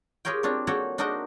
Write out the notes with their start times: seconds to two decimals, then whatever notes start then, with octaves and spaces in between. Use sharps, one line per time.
0.25 F4 G4 G#4 A#4 C#5 G5
0.43 C4 D4 F4 C#5
0.67 A#3 F#4 A4 C#5 F#5 G5
0.98 D4 D#4 F#4 A#4 C5 D#5